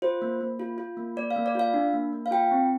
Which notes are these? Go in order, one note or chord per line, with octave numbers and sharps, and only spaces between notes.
F4 C5
A#3
A#3
F4
F4
A#3
A#3 D5
F5
A#3
D5
F4 F5
D4
A#3
A#3
F5
F4 G5
C4